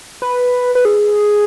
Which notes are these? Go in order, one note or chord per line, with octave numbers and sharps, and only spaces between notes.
B4
B4
G#4